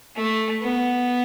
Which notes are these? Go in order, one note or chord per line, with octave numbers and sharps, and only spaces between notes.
A3
B3